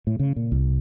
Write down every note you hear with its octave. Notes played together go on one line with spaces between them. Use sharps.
A2
C#3
A#2
C2